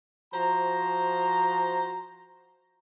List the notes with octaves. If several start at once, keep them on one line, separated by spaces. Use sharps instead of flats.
F3 F#4 C5 A#5